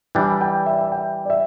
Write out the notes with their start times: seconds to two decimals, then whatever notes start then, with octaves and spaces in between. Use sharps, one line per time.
0.15 E3 G3 D4 G5
0.41 G5
0.66 E5
0.81 E5
0.92 G5
1.25 D5
1.30 E5